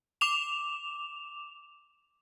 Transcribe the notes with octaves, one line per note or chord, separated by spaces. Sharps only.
D6 E7 F7